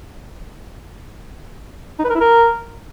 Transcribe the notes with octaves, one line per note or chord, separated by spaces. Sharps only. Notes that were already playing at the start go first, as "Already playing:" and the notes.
D#4
B4
A#4
E4
A#4